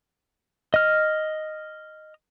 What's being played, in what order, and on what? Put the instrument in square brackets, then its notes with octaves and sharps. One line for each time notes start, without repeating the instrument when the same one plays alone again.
[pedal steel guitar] D#5 F6